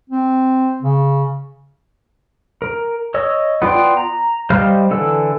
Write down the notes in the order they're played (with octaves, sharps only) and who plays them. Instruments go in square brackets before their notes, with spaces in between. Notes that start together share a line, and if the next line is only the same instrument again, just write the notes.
[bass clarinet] C4
C#3
[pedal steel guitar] A#4
C#5 D#5 E6
B3 F4 D5 G5 C6
A#5
G3 C5 D#5 F5 F6
D3 E3 A4 E6